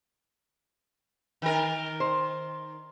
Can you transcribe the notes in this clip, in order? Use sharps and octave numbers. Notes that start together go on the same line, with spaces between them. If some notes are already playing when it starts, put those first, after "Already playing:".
D#3 A#4
C5